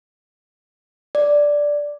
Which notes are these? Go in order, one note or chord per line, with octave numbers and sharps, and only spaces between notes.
D5